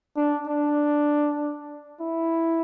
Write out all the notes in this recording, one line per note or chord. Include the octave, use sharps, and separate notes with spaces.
D4
D4
E4